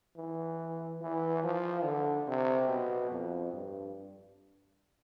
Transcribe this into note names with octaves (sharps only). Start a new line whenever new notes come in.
E3
E3
F3
D3
C3
B2
F2
G2